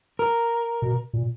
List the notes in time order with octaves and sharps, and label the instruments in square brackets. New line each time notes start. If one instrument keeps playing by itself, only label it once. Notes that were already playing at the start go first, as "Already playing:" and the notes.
[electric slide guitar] A#4
[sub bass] B2
A#2